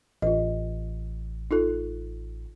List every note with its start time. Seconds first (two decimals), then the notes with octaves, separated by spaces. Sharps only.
0.22 A1 F4 D#5
1.51 D#4 F4 A4